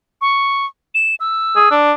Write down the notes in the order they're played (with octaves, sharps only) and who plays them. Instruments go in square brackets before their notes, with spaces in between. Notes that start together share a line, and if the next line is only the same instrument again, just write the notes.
[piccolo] C#6
E7
E6
[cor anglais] G#4
D4